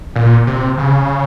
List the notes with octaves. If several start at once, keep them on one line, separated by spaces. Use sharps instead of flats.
A#2
C3
C#3